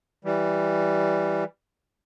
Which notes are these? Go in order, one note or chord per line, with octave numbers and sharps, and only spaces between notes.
E3 G3